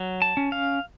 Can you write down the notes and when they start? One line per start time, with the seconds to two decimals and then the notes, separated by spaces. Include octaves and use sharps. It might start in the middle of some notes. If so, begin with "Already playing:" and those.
Already playing: F#3
0.22 A5
0.37 C#4
0.52 F5